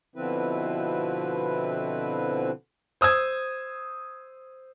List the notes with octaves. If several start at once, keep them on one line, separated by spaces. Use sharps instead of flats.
B2 D3 F3 C4 E4 B4
C5 D#6 E6 G#6